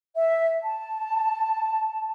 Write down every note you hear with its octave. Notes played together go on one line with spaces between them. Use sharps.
E5
A5